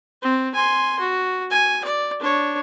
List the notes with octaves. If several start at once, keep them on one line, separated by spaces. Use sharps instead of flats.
C4
G#5 C6
F#4
G#5
D5
D4 C#5